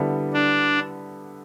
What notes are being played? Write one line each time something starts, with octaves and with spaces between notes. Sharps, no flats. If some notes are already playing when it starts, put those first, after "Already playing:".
Already playing: D3 G3 B3 E4 A4
D4